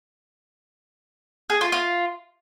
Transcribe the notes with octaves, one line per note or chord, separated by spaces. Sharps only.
G#4
F4
F4